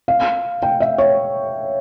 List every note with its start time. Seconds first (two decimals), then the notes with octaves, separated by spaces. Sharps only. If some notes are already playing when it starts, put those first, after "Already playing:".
0.08 F5
0.63 G5
0.80 E5
0.98 C#5